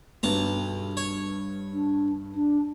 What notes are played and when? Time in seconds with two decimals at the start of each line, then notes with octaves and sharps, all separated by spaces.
0.23 B1 G2 B4 A5 A#5
0.97 C#5
1.73 D4
2.34 D4